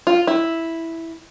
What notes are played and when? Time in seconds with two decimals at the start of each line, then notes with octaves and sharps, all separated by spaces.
0.07 F4
0.27 E4